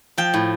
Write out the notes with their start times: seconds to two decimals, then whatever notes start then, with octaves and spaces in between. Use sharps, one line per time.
0.18 F3 G5
0.34 A2